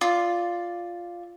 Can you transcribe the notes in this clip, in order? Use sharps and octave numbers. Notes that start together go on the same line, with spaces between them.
F4 D5